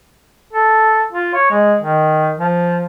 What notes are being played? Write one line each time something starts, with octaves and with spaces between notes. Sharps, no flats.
A4
F4
C#5
G#3
D#3
F3